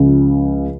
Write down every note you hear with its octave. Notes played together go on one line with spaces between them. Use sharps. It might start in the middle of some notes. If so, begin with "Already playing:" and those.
Already playing: C#2 C#3 F3